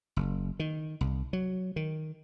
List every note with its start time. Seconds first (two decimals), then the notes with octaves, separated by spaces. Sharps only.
0.17 F#1
0.59 D#3
1.01 C2
1.33 F#3
1.76 D#3